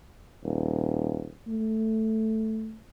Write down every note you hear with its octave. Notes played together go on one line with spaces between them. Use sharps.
D#1
A3